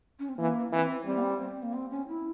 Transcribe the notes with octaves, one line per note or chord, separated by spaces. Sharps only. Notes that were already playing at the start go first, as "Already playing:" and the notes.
C#4
C4
E3 A#3
E3 C4
G3 C4
A#3
C4
C4
A#3
C4
C#4
E4